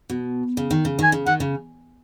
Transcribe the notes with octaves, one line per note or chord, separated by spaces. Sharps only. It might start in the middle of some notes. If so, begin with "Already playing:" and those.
B2
C#3
D#3
C#3
D#3 G#5
C#3
D#3 F#5
C#3